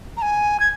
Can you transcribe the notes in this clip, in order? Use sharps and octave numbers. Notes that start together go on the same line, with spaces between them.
A#5
G#5
G#6